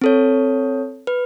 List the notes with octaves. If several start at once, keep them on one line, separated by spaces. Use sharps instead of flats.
C4 A4 C#5
B4